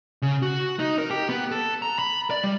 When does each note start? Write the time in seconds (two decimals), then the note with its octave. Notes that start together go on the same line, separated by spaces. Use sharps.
0.22 C#3
0.43 F#4
0.79 D#4
0.98 A#4
1.11 G4
1.29 B3
1.52 A4
1.82 A#5
1.99 B5
2.31 D5
2.44 G3